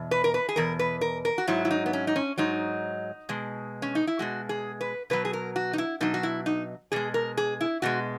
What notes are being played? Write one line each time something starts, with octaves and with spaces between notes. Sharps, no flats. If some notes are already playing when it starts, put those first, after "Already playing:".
Already playing: E2 B2
B4
A#4
B4
G#4
E2 B2 A#4
B4
A#4
A#4
F#4
G#2 F#3 E4
E4
D#4
B3
C#4
D#4
C#4
G#2 F#3 D#4
B2 G#3
C#4
D#4
E4
B2 G#3 F#4
G#4
B4
B2 F#3 B4
G#4
A#4
F#4
D#4
E4
B2 F#3 D#4
F#4
E4
D#4
B2 G#3 G#4
A#4
G#4
E4
B2 G#3 F#4